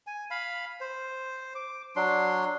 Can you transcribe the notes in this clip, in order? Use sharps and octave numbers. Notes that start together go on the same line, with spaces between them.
G#5
F5 B5
C5
D6
F#3 D4 C6